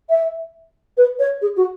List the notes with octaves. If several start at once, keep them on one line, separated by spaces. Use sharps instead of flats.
E5
B4
C#5
G#4
F#4